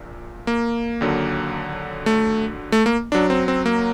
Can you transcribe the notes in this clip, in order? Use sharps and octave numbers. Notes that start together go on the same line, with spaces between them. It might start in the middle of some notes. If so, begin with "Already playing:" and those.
Already playing: A#1 A#2
A#3
D#2 D3 F#3
A3
A3
A#3
F#2 F#3 D4
C4
C4
A#3